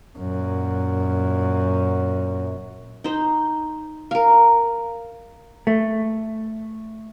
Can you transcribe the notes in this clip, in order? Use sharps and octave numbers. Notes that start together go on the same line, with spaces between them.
F#2 A#2
D#4 C5
A#4 F5
A3